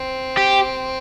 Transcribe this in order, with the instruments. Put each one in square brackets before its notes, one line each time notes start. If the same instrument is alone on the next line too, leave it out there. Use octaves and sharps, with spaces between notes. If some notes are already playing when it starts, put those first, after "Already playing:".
Already playing: [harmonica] C4
[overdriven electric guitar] G4